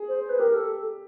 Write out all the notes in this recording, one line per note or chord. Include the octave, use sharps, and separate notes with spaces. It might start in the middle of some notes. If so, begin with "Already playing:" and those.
Already playing: G#4
C5
C5
B4
G4 A#4
A4